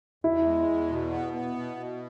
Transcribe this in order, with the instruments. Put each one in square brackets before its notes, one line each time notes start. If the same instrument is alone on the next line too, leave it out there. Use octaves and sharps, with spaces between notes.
[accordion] E2 [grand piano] E4
[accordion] G#3
E2
B2
B3
B3
B2
B2